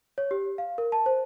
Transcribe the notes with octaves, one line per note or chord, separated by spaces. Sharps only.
C#5
G4
F5
A#4
A5
C5